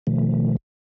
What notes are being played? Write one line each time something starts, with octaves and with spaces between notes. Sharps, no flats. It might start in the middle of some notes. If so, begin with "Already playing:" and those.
B2 D#3 F3 A3